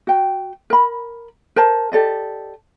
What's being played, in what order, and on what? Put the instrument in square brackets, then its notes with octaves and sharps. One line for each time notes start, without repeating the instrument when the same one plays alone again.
[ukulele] F#4 G5
A#4 B5
A#4 C5 A5
G4 A4 D5 D#5